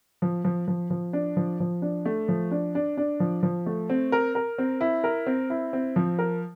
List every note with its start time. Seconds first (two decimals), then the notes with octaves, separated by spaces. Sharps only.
0.22 F3
0.45 F3
0.68 F3
0.90 F3
1.13 D4
1.37 F3
1.60 F3
1.82 D4
2.06 A3
2.28 F3
2.52 D4
2.75 D4
2.97 D4
3.20 F3
3.43 F3
3.66 A3
3.90 C4
4.12 A#4
4.35 A#4
4.58 C4
4.81 E4
5.04 A#4
5.27 C4
5.50 E4
5.73 C4
5.96 F3
6.19 A#4